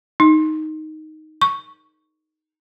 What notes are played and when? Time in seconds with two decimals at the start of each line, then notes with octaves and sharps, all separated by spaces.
0.20 D#4
1.41 C#6